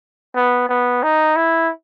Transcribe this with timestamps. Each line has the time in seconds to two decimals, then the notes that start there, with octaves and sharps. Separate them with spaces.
0.35 B3
0.69 B3
1.03 D#4
1.36 E4